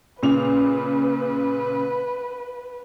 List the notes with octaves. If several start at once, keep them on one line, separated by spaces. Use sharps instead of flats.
A#2 C#3 B4 F7